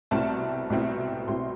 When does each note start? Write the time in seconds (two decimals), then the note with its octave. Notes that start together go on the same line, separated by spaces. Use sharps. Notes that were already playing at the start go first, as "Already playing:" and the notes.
0.11 C2 B2 A3 C4 E4 A5
0.70 C2 B2 A3 C4 E4
1.28 C2 B2 A3 C4 E4 C6